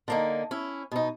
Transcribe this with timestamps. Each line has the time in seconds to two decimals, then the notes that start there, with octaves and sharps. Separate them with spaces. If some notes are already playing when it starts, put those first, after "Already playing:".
0.08 D3 A#3 D#4
0.51 C#4 E4
0.92 B2 D#4